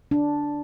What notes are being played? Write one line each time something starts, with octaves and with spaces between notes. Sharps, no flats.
D4